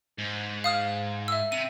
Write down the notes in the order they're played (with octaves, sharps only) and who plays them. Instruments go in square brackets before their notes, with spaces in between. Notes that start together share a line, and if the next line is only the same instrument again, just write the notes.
[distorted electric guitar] G#2
[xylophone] F5 D#6 F6
E5 E6
[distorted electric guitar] C3 [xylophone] D#7